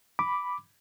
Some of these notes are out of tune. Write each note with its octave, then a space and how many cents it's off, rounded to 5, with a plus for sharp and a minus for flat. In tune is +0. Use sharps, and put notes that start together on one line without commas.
B5 +0 D6 +0